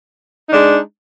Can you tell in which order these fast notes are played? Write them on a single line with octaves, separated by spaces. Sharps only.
D#4 D4 G#3